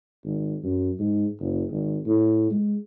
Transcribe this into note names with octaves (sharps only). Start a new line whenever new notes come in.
G#1
F#2
G#2
F#1
G#1
A2
G#3